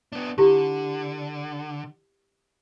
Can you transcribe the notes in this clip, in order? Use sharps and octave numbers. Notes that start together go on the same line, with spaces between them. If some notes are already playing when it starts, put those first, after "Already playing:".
B3 D4
D3 E4 F4 G4